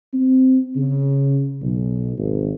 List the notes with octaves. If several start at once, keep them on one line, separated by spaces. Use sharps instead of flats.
C4
C#3
B1
G#1